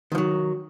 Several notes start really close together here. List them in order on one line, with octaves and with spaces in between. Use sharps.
D#3 F3 F#3